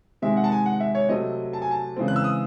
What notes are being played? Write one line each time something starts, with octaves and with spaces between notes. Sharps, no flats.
C3 D#3 G#3 E5
F#5
A5
G#5
F#5
E5
C#5
C3 F#3 A3 C4 D#5
A5
G#5
A5
C#3 E3 G#3 C4
F#6
E6
D#6